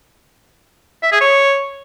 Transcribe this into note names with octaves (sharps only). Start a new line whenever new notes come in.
E5
G#4
C#5